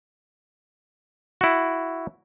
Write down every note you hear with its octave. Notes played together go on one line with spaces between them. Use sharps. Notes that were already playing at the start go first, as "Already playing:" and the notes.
E4 F#4